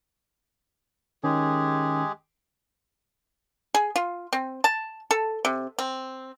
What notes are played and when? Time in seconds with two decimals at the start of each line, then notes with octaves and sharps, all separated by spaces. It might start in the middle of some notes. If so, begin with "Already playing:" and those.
1.24 D#3 G#3 C#4 G4 G#4
3.74 G#4
3.96 F4
4.33 C4
4.64 A5
5.11 A4
5.45 C3
5.79 C4